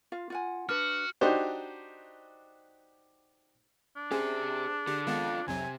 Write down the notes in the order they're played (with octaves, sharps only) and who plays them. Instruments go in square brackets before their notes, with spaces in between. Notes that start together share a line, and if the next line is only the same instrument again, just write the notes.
[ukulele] F4 F5
F4 F#5 G#5
[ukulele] D4 B4 [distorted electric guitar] F#4 [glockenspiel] F6
[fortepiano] D4 D#4 F#4 G4 C5
[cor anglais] D4
[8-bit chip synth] C#4 [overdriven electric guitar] G4 C5 [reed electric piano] G#4
[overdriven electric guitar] D3 [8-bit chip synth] G4
[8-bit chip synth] D#3 G#3 B3 [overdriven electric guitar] F4 A4
[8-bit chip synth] B1 F2 F#3 [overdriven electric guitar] C3 [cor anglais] G#5